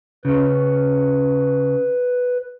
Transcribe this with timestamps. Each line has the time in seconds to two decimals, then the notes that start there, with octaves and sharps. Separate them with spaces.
0.25 C#3 C#4 B4